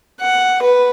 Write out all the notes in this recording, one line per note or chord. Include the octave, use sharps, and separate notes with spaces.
F#5
B4